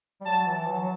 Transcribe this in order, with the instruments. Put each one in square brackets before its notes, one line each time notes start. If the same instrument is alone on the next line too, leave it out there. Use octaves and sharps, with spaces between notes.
[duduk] G3
[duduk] F#3 [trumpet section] A5
[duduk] E3
F#3
F#3